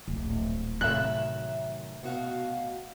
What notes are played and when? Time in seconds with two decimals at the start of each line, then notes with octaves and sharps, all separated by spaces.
0.08 D1 A#1
0.81 F#2 A2 C3 D#3 E5 F#6
2.03 B2 F#4 F5